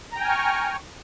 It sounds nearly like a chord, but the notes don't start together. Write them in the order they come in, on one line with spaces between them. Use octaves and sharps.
A#5 G5 G#5 F6 C#6